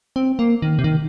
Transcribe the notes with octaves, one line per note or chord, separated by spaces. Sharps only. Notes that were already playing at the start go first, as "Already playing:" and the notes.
C4
A#3
D#3
C3
D#3